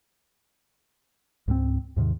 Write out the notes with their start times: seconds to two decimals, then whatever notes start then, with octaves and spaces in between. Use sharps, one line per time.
1.48 C#2 G#2 F#3 C4
1.96 D#2 G#2 C3 D#3